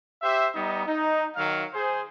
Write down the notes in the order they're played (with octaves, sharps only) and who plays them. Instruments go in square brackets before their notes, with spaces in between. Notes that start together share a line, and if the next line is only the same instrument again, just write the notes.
[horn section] G4 C5 E5
G3 B3 D#4
D#4
D#3 F#3 F5
G#4 C5